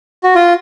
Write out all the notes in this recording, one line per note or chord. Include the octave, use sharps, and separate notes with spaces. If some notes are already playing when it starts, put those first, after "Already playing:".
F#4
F4